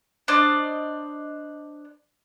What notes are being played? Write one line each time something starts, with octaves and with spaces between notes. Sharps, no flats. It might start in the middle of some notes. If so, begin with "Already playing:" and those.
D4 C5 D5 D#5